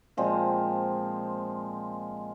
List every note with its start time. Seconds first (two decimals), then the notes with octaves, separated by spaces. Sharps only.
0.17 A#2 F3 G#3 C4